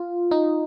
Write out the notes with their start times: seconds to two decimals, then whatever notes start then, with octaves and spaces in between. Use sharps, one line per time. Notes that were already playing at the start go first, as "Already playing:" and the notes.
Already playing: F4
0.31 D#4